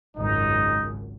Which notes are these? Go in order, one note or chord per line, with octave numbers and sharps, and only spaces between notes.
G#1 C#2 F#2 D#4